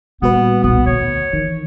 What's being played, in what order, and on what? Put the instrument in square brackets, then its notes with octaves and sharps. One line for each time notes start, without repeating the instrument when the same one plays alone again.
[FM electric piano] A#2 F#4 B4 [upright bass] G3 [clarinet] B3
[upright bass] B1 [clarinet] B3
[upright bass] D2 [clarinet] C#5
[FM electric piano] D#3 [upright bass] E3